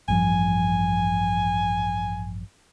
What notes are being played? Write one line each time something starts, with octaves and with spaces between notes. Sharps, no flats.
A1 G2 F3 G#5